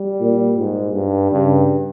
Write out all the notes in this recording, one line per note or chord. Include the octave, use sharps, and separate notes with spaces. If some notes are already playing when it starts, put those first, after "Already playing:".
Already playing: G3
A#2
G#2
G2
G2 C#3